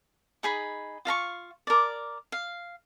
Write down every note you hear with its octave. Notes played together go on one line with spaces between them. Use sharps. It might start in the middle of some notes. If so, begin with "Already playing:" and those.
D#4 G#4 B5
F4 F5 A#5 C#6
A#4 D5
F5